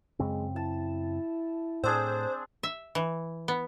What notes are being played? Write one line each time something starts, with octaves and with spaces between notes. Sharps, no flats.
F#2 C#3 G#3 C4
E4 A5
A2 C4 D4 G#4 C5
E5
E3
B3